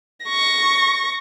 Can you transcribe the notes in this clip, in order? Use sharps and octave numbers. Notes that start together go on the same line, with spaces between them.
C#6 A#6